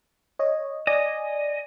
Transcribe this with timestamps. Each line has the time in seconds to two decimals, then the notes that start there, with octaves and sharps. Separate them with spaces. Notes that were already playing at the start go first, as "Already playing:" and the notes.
0.39 C#5 D#5
0.87 D5 D#5 G#5